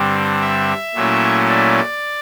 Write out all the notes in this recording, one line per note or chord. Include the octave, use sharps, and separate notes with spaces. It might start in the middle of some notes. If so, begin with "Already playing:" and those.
Already playing: G2 D3 G3 C4
E5
A#2 F#3 A3 C#4 E4
D5